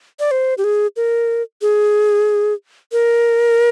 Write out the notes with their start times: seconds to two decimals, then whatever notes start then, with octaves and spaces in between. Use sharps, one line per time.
0.20 D5
0.31 C5
0.58 G4
0.64 G#4
0.97 A#4
1.62 G#4
2.92 A#4